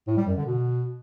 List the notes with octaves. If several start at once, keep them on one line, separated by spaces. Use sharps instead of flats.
A2
G3
F#2
D3
B2